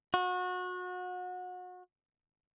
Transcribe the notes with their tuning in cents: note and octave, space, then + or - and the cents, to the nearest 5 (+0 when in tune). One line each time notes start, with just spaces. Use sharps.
F#4 -30